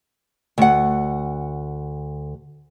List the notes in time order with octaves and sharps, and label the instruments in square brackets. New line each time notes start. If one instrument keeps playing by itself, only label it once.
[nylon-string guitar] D2 F#5